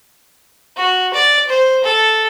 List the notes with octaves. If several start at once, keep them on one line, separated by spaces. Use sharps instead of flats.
F#4
D5
C5
A4